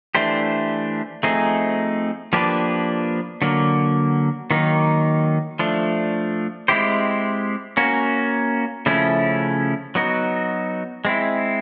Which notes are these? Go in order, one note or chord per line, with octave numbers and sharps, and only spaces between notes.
E3 A3 D4 G4 C5
F3 A3 C4 D#4 G#4
F3 A#3 D4 G4 B4
D3 F#3 A#3
D#3 F#3 A#3 D#4
F3 A3 D4
G#3 C4 E4 G4 C5
A#3 C#4 F#4
C#3 F3 A3 C#4 E4
F#3 B3 D#4 F#4
G#3 C4 E4